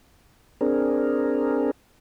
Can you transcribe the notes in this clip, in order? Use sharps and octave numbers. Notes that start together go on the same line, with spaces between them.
C4 D4 G#4 A#4